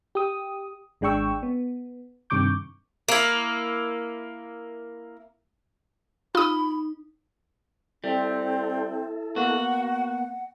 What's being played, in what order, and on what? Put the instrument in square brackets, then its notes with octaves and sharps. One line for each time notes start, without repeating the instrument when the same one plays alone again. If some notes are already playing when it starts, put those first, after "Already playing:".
[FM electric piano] G4 D#6
G#1 G#3 D4 G5 C#6 E6
B3
G2 C3 D#3 C#6 D6 G6
[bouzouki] A#3 E4
[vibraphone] D#4 [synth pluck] F4 D#6 [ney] B5
[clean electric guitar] G3 [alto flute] C4 [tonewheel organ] E4 A4
[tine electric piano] A#3 B3 [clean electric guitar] F#4 [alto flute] F#5